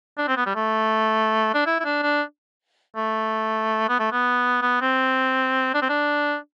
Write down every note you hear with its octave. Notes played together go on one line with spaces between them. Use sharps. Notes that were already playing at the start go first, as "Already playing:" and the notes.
D4
C4
B3
G3
A3
D4
E4
E4
D4
D4
A3
B3
A3
B3
B3
C4
D4
C4
D4